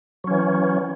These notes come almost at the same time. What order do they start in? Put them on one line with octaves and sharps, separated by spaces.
F#3 C#4 E3